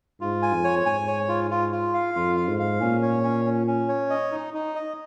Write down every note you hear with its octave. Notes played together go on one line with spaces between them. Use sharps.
G#2 F4
G#5
F2
C#5
G#2 G#5
C#5
F4
F4
F4
F5
F2 F4
F5
G#2
F5
A#2 C#4
C#5
C#4
C#4
C#4
C#5
D#5
D#4
D#4
D#5